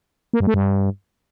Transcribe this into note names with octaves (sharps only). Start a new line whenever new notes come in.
A#3
G2
A3
G2